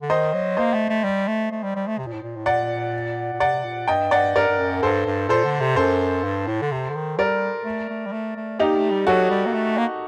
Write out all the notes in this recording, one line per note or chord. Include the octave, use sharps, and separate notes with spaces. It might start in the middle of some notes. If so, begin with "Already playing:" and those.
D3
D#3 C5 D#5
F#3
A#3 C5 D#5
A3
A3
G3
A3
A3
G3
G3
A3
C3
A#2
A2
A#2
A2
A#2 D5 F#5
A#2
C3 D5 F#5
A#2
G2 D#5 G5
G2 D5 F#5
G2 A#4 D5
G2
F#2
G2 A4 C5
G2
A#2 A4 C5
D3
C3
F#2 A4 C5
G2
A2
D3
C3
D3
D#3
G3 A#4 D5
A3
A3
G3
A3
A3
A#3 D#4 G4
A3
G3
F#3 F#4 A4
G3
A#3
A3
A#3